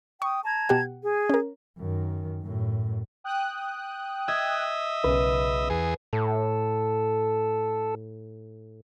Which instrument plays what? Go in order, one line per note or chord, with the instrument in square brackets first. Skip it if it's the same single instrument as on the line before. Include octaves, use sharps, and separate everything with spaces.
[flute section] G5 D#6 [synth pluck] C#6
[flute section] A5 A#5 G#6
[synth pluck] B2 G4 F#5
[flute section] G#4
[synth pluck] C#4 A#4
[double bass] F#2 D#3
F#2 A2
[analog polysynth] G5 D#6 F#6
[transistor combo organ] D#5 E5 [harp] G#6
[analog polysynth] B1 C#3 [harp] B4
[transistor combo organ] E2 G#4
[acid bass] A2 [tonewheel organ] A4